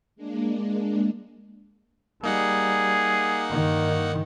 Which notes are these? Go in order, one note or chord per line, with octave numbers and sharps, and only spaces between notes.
G#3 A#3 D4
G3 A#3 D#4 G#4 F#5
G2 D#3